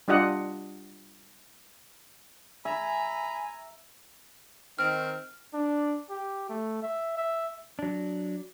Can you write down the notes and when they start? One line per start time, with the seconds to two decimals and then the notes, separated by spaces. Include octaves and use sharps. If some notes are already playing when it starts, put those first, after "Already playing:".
0.08 G3 D4 F4 G4 D#5 F#5
2.65 E5 G#5 A#5 B5
4.79 D#3 C4 F6
5.54 D4
6.10 G4
6.49 A3
6.82 E5
7.17 E5
7.79 F#3 D4